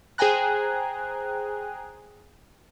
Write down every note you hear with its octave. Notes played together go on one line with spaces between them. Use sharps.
G#4 C5 G5 G#5 A#5 F#6